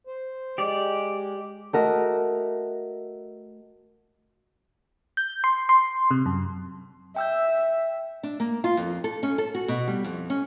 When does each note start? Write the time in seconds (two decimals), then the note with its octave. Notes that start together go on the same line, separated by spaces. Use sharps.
0.07 C5
0.58 G#3 G4 D5
1.73 A3 F#4 A#4 D#5
5.17 G6
5.44 C6
5.69 C6
6.11 C3
6.26 F#2
7.16 E5 G5 E6 G6
8.23 D4
8.40 A#3
8.64 F4
8.77 F2
9.04 A4
9.23 C#4
9.38 A4
9.55 F#4
9.68 B2
9.88 G3
10.04 F2
10.30 C#4